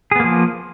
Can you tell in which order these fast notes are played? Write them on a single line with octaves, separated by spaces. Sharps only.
G#4 B3 A#3 F3